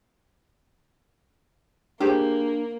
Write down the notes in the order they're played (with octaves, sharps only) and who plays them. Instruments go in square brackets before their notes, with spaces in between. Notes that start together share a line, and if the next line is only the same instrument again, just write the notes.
[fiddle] A#3 [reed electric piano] D4 [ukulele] G4 G#4 C5